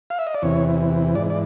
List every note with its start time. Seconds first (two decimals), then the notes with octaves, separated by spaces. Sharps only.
0.10 F5
0.19 E5
0.27 D#5
0.34 D5
0.42 E2 C3 E3 C#5
1.15 G#2 E3 D5
1.30 D5